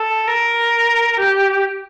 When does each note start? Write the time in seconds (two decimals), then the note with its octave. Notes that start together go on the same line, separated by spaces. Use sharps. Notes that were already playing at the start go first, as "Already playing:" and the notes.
Already playing: A4
0.28 A#4
1.19 G4